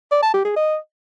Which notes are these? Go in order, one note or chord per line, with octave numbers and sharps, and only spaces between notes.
D5
A5
G4
G#4
D#5